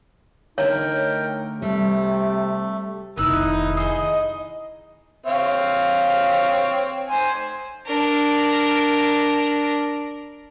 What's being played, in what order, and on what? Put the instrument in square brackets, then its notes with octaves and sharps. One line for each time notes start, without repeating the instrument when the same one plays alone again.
[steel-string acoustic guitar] D3 A3 [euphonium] D#4 [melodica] A#4 G5 [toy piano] C#5
[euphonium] C3 [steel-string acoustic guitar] G3 [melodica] A3
[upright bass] F1 D#3 [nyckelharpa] D#4 E4 [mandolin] E6 F#6
[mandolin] G#4 C6 [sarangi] D#5
[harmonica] C4 C#5 F5
C5 G#5
[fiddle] D4 A#4